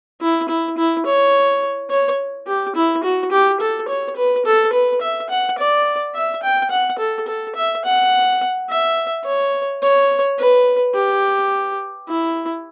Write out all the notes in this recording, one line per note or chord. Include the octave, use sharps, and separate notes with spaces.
E4
E4
E4
C#5
C#5
G4
E4
F#4
G4
A4
C#5
B4
A4
B4
E5
F#5
D5
E5
G5
F#5
A4
A4
E5
F#5
E5
C#5
C#5
B4
G4
E4